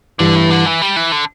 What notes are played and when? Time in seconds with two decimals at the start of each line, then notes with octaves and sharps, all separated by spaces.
0.19 G2 D3 E3 G3
0.35 A2
0.50 D3
0.66 E3
0.82 G3
0.96 E3
1.12 D3